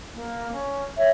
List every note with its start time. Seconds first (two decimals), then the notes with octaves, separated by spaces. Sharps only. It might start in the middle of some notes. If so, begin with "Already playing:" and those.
0.14 A#3
0.52 C#4
0.97 C#5 E5